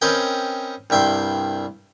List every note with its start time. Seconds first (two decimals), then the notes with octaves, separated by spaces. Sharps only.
0.02 C4 C#4 A#4 B4 D#5 G5
0.90 C2 G2 E5 G5 C6